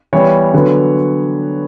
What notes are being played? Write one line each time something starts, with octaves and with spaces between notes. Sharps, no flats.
E3 G3 B3 C#5
D3 F#3 B3